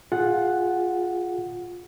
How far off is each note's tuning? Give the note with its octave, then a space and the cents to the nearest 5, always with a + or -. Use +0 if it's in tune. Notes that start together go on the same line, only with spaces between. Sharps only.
F4 +15 G#4 +0 F#5 +0